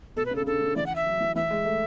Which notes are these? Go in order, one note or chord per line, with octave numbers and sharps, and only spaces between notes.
B2 A4
B4
C#3
A4
C#3
D3 A4
D3
E3 D5
F#5
E5
F#3
E3
E3 E5
G#3
A3